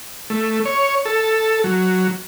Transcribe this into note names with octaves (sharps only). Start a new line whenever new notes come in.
A3
C#5
A4
F#3